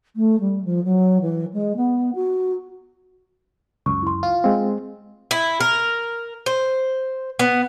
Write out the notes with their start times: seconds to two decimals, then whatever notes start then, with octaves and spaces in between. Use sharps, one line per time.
0.16 A3
0.40 G3
0.64 F3
0.84 F#3
1.21 E3
1.53 G#3
1.76 B3
2.15 F#4
3.86 C#2 F#2 C#6
4.03 E4 C6
4.23 F4
4.44 G#3 C4 F5
5.31 E4
5.60 A#4
6.46 C5
7.39 B3